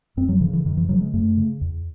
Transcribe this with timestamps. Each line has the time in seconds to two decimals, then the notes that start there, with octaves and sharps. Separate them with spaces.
0.17 F#2 C4
0.29 F#3
0.41 C#3 E3
0.53 E3
0.65 F#2 D#3
0.77 E3
0.88 C#3 F#3
1.01 G#3
1.13 F#2 A3
1.37 C#3
1.61 E2